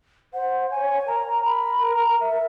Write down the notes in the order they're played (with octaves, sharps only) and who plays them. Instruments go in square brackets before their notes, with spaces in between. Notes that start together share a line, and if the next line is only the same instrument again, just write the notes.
[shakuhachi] C5 [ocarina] F#5
[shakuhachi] C#5 [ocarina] G#5
[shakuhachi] A#4 [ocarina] A#5
[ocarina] B5
A#5
E5